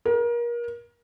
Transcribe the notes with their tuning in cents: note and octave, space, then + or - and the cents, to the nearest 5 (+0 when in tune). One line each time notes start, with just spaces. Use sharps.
A#4 +30